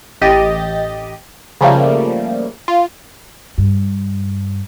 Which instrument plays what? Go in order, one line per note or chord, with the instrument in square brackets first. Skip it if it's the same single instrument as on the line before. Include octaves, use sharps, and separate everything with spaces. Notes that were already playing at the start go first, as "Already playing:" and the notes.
[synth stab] A1 G4 D#5 A6 D#7
C#3 F3 G3 A3 A#3
F4
[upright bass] G2